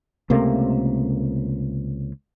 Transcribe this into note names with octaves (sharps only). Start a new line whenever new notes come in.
C#2 C3 A3 A#3